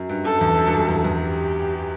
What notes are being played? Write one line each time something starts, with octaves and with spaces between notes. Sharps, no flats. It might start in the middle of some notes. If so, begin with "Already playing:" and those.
Already playing: F#2
G2
F#2 A4
E2
F#2
G2
F#2
E2
E2
G4